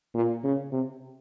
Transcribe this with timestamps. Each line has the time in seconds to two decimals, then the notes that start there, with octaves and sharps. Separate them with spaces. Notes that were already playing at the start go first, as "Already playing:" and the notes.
0.15 A#2
0.44 C#3
0.72 C3